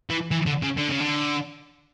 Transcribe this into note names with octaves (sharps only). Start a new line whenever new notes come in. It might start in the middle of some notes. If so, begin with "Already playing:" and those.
E3
E3
D3
C#3
D3
C#3
D3